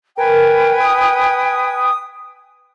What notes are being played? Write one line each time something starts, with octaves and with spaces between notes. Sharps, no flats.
A#4 B4 G5 G#5
D#6